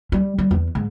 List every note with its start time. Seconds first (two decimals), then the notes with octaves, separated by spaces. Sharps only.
0.12 G3
0.39 G3
0.51 E2
0.75 G#2